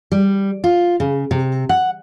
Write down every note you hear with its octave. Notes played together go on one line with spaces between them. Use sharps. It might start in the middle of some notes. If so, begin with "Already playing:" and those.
G3
F4
C#3
C3
F#5